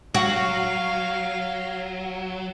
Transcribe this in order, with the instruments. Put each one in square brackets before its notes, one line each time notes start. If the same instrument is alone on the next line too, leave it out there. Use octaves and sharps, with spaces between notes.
[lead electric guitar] F#3 [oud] F#4 [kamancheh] F5